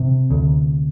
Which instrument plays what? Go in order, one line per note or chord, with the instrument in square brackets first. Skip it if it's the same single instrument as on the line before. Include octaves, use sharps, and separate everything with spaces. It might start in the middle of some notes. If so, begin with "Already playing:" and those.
Already playing: [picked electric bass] C3
D2